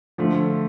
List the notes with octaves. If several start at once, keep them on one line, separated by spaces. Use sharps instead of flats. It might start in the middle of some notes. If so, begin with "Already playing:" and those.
D3 F3 A3